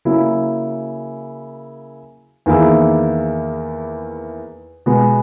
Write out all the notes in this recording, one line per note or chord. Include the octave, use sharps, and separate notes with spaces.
C#3 F#3 A#3 E4
E2 D#3 A#3 E4 G#4
B2 G#3 B3 F#4